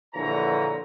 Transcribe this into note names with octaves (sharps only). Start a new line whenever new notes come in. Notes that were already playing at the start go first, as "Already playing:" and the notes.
A#1 D3 E3 F4 C#5 A#5